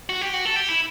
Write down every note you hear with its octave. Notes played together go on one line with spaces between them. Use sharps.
F#4
G4
F#4
A4
G4
E4